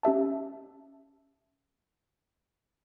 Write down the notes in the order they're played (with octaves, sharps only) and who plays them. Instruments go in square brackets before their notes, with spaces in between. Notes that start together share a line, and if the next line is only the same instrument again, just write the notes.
[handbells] C#4 G4 E5 A5